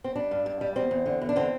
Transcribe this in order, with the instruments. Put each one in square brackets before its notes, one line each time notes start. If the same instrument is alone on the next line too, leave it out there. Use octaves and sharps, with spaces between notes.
[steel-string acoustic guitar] C4
G3 D4
G2
G2
G3
E2 C4
E2
D3
E2
D4
D3 C4